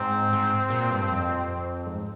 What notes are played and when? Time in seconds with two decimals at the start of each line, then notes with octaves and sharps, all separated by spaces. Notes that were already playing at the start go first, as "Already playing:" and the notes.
Already playing: G#2 C4
0.33 G#2
0.70 A#2
0.91 G2
1.10 F2
1.86 G#2